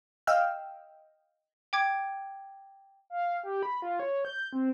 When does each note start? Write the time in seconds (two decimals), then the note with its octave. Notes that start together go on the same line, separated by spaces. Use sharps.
0.27 D#5 F5 G5 E6 F6
1.73 G5 D6 G#6
3.10 F5
3.43 G4
3.63 B5
3.82 F4
4.00 C#5
4.25 G6
4.53 C4